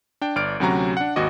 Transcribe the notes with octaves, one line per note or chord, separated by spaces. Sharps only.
D4 G5
G1 D5 F6 D7
D2 C3 F#3 C#4 F#4 A#5
D4 F#5
G#1 D#2 F#4 D#5 D6